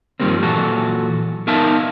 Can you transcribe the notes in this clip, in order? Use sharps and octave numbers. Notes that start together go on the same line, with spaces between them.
G2 D#3 F3 G3 A#3 C4
A#2 E3 F#3 F#4 A4
B3 D#4 A#4 E5 F5 A5